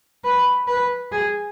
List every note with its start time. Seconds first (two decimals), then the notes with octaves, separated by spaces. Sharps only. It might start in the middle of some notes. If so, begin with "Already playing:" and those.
0.24 B4
0.67 B4
1.12 G#4